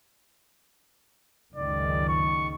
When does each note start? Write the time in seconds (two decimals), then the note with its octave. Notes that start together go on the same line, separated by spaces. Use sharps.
1.56 F#1 C#2 D#3 D5
2.09 C#6